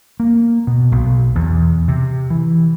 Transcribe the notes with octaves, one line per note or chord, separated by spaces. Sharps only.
A#3
B2
B1
E2
C3
E3